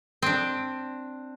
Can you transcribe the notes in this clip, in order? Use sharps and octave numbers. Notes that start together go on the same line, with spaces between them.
C4 D4